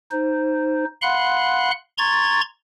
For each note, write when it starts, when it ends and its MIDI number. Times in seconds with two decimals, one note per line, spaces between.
0.11 0.84 63
0.11 0.84 72
1.02 1.71 77
1.02 1.71 78
1.02 1.71 83
1.02 1.71 84
1.02 1.71 90
1.98 2.41 82
1.98 2.41 84
1.98 2.41 85
1.98 2.41 92
1.98 2.41 93